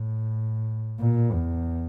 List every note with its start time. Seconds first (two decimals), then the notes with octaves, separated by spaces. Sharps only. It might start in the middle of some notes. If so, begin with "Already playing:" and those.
Already playing: A2
0.99 A#2
1.32 E2